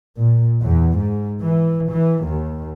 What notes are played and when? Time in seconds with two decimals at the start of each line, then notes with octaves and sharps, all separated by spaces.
0.17 A#2
0.62 E2
0.97 G#2
1.41 E3
1.90 E3
2.25 D#2